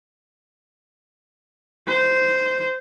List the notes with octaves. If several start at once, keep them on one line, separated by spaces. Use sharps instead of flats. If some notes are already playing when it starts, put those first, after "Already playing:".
C5